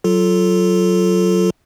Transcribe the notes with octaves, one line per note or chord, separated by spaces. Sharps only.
F#3 F4 A4